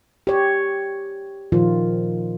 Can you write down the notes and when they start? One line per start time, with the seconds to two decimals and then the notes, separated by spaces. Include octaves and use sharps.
0.27 G4 C#5
1.52 A#2 D#3 F3 F4